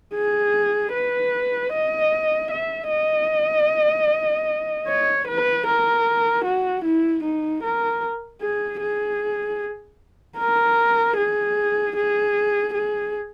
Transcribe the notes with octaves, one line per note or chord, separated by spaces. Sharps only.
G#4
B4
D#5
E5
D#5
C#5
B4
A#4
F#4
E4
D#4
A#4
G#4
G#4
A#4
G#4
G#4
G#4